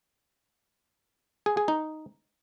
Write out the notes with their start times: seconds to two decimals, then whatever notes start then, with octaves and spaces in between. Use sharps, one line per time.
1.46 G#4
1.57 G#4
1.68 D#4